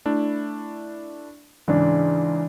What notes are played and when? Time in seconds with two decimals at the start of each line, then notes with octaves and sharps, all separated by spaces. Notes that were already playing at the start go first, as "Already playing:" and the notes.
0.05 A3 D4 E4
1.68 G#2 C#3 E3 D4